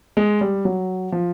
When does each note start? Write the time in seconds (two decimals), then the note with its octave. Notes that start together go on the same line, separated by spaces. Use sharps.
0.17 G#3
0.41 G3
0.65 F#3
1.12 F3